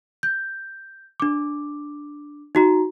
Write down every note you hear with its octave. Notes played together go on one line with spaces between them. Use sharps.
G6
D4 D6
D#4 F#4 A#5